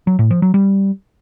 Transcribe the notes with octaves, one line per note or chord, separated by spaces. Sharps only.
F#3
A2
F3
F#3
G3